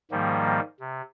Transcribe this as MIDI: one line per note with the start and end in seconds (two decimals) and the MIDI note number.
0.11 0.60 44
0.11 0.60 51
0.11 0.60 53
0.11 0.60 55
0.11 0.60 58
0.80 1.02 48